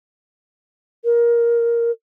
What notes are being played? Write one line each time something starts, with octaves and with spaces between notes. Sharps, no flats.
A#4